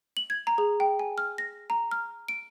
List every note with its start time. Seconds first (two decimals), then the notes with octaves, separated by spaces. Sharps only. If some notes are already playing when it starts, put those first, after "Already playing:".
0.17 F#7
0.30 G#6
0.47 A#5
0.58 G#4
0.80 G5
0.99 G#5
1.18 F6
1.38 A#6
1.70 A#5
1.91 F6
2.28 D7